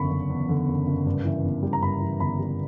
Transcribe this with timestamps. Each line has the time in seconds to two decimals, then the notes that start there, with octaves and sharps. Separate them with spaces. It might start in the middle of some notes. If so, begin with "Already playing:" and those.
Already playing: F#1 E2 D3 B5 C#6
0.11 F#1
0.30 E2
0.49 D3
0.68 F#1
0.87 F#1
1.06 G2
1.25 E3
1.44 G1
1.63 G3
1.73 A#5
1.82 G2 B5
2.01 E3
2.20 G1 B5
2.39 G3